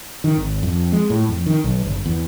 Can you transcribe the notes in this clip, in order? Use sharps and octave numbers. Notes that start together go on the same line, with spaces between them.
D#3
G#1
F2
G#3
A2
F2
D#3
B1
G1
E2